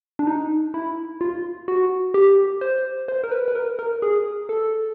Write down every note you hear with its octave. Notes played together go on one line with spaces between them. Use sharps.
D4
D#4
E4
F4
F#4
G4
C5
C5
A#4
B4
B4
A#4
A#4
G#4
A4